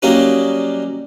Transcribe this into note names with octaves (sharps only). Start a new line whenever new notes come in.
F#3 G3 A#3 C#4 D#4